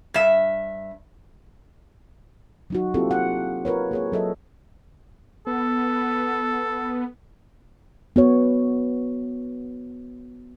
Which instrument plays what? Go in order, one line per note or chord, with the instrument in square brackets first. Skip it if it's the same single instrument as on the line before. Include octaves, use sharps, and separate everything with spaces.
[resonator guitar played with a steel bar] G2 E5
[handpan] F#3 D#4 F#4
A#3 C4 E4 F4 G4 A4
F#5
F4 A#4 B4 C#5
A#3 G#4 C#5
F#3 A4 D#5 E5
[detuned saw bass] B3 [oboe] A4
[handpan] B3 F#4 C#5